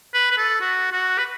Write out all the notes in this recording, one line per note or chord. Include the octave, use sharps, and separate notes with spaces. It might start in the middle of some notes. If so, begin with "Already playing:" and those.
B4
B4
A4
F#4
F#4
B4